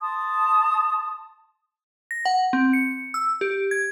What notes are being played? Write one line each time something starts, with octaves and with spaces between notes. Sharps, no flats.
A5 C6 D#6
A#6
F#5
C4
C#7
E6
G4
G#6